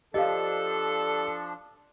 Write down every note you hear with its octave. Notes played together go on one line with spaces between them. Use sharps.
F3 D4 G4 A4 D#5 F5